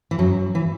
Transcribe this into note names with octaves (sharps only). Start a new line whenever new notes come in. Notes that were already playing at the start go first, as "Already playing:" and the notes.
E3
F#2 F#3
E3